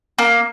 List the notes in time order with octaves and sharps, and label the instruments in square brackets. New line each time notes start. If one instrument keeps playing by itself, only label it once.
[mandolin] A#3